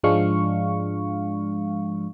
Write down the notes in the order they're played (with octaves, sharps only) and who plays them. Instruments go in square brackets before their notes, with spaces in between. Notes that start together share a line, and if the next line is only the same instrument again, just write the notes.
[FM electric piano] G#2 F3 G#3 D4 F5 C#6